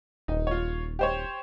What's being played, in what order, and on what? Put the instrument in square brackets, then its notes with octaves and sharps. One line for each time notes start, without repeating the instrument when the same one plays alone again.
[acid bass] D#1 [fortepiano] D#4
[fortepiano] F4 C#5
G4 C5 C#5